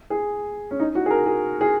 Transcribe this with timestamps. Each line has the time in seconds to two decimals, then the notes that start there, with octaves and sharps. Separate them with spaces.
0.10 G#4
0.71 C#4
0.80 D#4
0.95 F#4
1.06 G#4
1.11 A#4
1.26 G#4
1.61 G#4